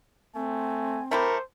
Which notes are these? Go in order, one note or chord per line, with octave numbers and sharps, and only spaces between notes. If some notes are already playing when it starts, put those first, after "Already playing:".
A3 C4 G#5
A3 E4 G4 A#4 C5